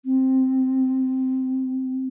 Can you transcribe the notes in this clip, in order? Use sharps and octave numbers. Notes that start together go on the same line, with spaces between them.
C4